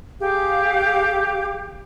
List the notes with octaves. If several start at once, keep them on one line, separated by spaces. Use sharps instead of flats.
G4 G#4 F5